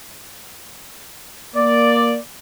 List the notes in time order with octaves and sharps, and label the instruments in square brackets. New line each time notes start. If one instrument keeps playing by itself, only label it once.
[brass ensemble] A#3 D5